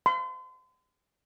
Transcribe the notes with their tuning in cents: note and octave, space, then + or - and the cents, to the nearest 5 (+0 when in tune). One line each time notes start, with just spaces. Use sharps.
C6 -35